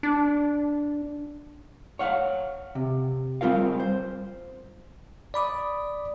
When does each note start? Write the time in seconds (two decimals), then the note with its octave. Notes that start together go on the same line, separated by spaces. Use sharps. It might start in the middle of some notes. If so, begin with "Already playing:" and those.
0.03 D4
1.99 C#5 F5 F#5
2.75 C3
3.41 G3 C4 F4 A#4 F5
3.80 C5
5.34 D5 B5 D6 D#6